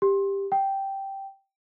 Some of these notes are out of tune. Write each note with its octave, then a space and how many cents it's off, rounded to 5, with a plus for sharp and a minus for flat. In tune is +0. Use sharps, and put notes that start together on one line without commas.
G4 +10
G5 -5